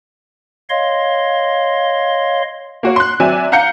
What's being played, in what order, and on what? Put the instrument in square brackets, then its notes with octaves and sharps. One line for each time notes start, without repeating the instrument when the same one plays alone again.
[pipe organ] C#5 D#5 F5 C6
[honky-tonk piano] A#3 F#4 C#5
C6 F#6
F#3 C4 D5 E5 G#5
F5 F#5 A#5 G6 C#7